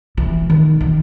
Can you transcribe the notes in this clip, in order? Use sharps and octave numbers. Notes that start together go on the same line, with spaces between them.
E3
D#3
D#3